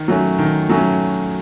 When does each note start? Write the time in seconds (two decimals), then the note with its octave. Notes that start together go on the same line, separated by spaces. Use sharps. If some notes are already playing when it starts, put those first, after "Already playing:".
Already playing: D#3
0.08 F#3 A3 C#4
0.39 D#3
0.69 F#3 A3 C#4